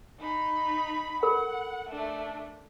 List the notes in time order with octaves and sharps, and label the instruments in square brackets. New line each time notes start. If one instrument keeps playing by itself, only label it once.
[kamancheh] D#4 B5
[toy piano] A4 A#4 B5 [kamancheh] F#5
[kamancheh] A3 D4